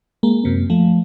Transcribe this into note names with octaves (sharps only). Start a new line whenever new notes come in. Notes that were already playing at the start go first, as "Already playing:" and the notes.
G#3 A#3
F#2 C3 A#3
F3 A3